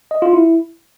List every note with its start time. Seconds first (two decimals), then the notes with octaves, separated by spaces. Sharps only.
0.11 D#5
0.22 F4
0.33 E4